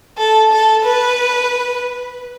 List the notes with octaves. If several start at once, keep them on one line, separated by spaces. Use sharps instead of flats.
A4
A4
B4